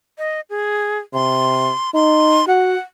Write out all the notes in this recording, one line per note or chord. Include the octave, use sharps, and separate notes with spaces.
D#5
G#4
C3 C6
D#4 C6
F#4 F#5